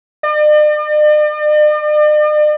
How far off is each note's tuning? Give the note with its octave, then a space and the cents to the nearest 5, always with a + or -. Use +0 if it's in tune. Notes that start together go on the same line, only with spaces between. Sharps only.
D5 +45